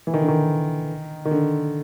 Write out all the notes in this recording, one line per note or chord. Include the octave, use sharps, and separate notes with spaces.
E3
D#3
D3
D#3
D#3
D3